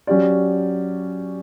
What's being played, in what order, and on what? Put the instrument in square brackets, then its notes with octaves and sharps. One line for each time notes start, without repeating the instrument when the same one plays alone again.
[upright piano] F#3 C#4 G4 D5